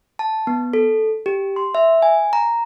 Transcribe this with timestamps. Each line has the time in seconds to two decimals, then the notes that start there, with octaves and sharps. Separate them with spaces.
0.19 A5
0.47 B3
0.73 A4
1.26 G4
1.56 C6
1.75 E5
2.02 G#5
2.33 A#5